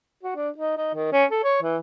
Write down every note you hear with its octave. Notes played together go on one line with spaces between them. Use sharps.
F#4
D4
D#4
D#4
D#3
C#4
A4
C#5
E3